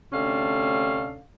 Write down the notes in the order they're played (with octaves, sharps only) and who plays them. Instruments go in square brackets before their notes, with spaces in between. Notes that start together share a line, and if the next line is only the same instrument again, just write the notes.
[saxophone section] D2 C3 C#4 D4 A4 F5